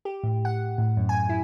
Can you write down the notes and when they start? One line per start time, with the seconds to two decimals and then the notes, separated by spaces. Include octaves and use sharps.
0.05 G4
0.24 A2
0.45 F#5
0.78 A2
0.97 F#2
1.09 G#5
1.29 E4